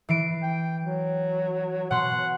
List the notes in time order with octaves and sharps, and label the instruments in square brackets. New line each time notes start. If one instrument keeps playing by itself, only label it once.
[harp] E3 C7 D7
[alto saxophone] G5
F#3
[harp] B2 C6 [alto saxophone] F#5